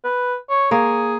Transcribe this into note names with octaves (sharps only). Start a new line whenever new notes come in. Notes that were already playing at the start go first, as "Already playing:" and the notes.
B4
C#5
A#3 G#4 C#5